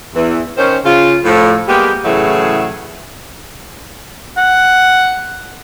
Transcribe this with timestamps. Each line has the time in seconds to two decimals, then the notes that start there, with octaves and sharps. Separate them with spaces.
0.15 E2 E3
0.57 D#3 C#4 C5
0.84 C#3 F4
1.24 A2 F3
1.68 G3 G#3 A#3 B3 G4
2.05 A2 C#3 E3 F#3 G#4 E5
4.37 F#5